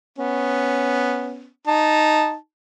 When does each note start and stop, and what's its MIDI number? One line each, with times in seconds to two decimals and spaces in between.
0.18 1.48 59
0.18 1.48 61
1.67 2.35 63
1.67 2.35 81